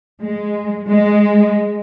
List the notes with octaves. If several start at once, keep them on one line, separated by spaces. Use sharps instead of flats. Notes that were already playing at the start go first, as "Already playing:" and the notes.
G#3
G#3